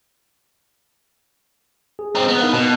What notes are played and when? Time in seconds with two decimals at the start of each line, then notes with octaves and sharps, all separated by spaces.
1.99 G#4
2.15 C4 D#4
2.28 B3
2.41 D#4 A#4 F5
2.53 B2 A5